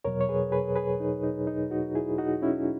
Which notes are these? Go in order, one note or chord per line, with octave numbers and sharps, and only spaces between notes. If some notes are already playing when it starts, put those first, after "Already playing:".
E2 B2 F#3 A#4 C#5
C#5
G#4 B4
G#4 B4
G#4 B4
D#4
D#4
D#4
D#4 F#4
E4 G#4
D#4 F#4
C#4 E4